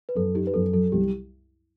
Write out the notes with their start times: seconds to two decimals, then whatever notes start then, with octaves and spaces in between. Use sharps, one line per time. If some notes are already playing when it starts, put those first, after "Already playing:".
0.09 B4
0.15 F#2 A4
0.35 D#4 G4
0.47 B4
0.54 F#2 A4
0.73 F#3 A4
0.92 C2 G4